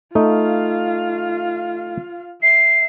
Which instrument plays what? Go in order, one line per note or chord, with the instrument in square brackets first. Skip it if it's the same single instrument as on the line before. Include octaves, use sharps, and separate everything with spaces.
[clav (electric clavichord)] A3 D#4 [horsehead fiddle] F4 F5
[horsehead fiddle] E5 [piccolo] C7